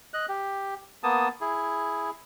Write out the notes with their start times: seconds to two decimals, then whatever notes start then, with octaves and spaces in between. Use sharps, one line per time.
0.14 D#5 F#6
0.29 G4
1.03 A#3 B3 A5 D#6
1.41 E4 G#4